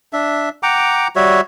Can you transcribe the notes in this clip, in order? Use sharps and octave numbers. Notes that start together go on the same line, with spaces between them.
D4 E5
F#5 G5 A#5 D6
G3 F#4 C#5 E5